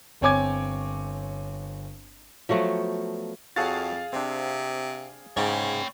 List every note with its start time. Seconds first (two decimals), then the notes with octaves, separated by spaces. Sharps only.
0.21 G1 C4 C#5 G#5 D6 G#6
2.49 F3 F#3 A3 B3
3.56 F2 F#4 G#4 A4 C#5 F5 A6
4.13 C3 C4 D4
5.37 G#2 C#3 C#5 G5